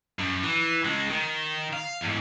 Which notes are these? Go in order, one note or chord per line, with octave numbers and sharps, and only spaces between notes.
F#2
E3
C#3 G#3
D#3
F5
E2 G#2